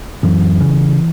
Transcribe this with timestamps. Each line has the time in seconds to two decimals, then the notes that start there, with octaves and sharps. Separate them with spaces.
0.23 F#2 E3
0.60 C#3